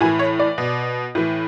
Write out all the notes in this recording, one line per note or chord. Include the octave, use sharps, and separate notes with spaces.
A2 E3 G#5
C#5
D5
B2
A2 E3